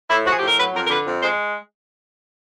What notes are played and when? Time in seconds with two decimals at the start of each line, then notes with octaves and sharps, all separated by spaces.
0.10 A2 E4
0.25 F3 F#4
0.32 G#4
0.37 G4
0.42 A2
0.48 A#4
0.58 F#3 B4
0.75 F2 A#4
0.87 A#4
0.90 D3 B4
1.07 F2
1.22 G#3 C5